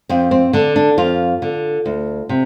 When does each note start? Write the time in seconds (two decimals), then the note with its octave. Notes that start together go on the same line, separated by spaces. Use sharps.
0.09 F2 C4
0.31 C4
0.53 D3 D4
0.76 D4
0.98 F2 F4
1.42 D3
1.86 D2
2.29 C3